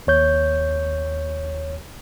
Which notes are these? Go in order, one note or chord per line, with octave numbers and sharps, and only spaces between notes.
D#2 C#5 G6